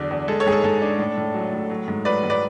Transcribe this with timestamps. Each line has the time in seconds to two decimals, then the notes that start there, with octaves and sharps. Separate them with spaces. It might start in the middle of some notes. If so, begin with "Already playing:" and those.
Already playing: E2 D3 F#3 D4
0.11 E2
0.28 G#3 A4
0.40 A4 C#5
0.47 G#2 G#4
0.52 A4
0.63 G#2 A4
0.82 D4
0.99 A2
1.17 A2
1.34 F#3
1.53 A2
1.70 F#3
1.88 G#2
2.05 F#3 B4 D5
2.23 G#2
2.30 B4 D5